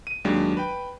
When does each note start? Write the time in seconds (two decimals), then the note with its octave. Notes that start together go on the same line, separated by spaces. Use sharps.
0.07 D#7
0.25 D#2 F#3 G#3 D4
0.57 B4 G5